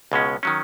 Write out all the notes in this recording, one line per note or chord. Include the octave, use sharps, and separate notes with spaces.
C#2 B2 G#3 C#4
D#3 F#3 C#4